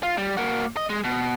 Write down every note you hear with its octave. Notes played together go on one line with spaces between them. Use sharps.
F4
G3
A#3 F#4
D#5
G#3
B2